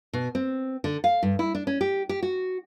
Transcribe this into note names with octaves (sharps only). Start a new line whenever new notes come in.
B2
C4
D3
F5
G2
E4
D4
C#4
G4
G4
F#4